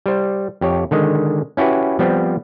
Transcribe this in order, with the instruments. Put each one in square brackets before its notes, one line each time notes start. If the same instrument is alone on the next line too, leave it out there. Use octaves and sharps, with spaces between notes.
[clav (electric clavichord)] G3 C5
F2 G4 C#5
D3 D#3 G#3 D#5
C#4 E4 F#4 G4 B4
F3 G3 B3 C4